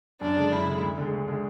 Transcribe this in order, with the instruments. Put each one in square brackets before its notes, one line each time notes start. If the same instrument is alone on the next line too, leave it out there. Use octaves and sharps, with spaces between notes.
[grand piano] F#2 [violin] D4
[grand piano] D3 G#3
[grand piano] F#2 [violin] E4
[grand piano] D3 G#3
D2
D3 G#3
D2
D3 G#3